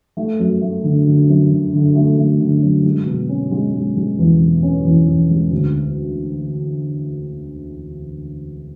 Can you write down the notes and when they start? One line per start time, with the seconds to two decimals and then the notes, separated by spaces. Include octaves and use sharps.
0.17 A3
0.39 F#2
0.62 A3
0.84 D3
1.07 D3
1.29 F#2
1.51 D3
1.73 D3
1.95 A3
2.18 A3
2.40 D3
2.63 F#2
2.84 G#3
3.06 B2
3.29 C#4
3.51 G#3
3.74 G#3
3.96 G#3
4.19 E2
4.40 B2
4.63 C#4
4.85 E2
5.08 E2
5.30 G#3
5.51 D2